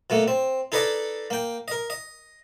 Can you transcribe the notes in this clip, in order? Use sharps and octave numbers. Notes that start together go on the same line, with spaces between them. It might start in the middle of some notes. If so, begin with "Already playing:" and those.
B2 A3 A#3
C4
D#4 G#4 A4 B4 D5 D#5
A#3 G5
A#4 D#5
D#5